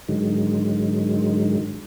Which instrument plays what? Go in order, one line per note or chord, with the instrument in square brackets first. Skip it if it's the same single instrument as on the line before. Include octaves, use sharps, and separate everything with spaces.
[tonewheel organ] G#2 D3 D#3 F#3 G#3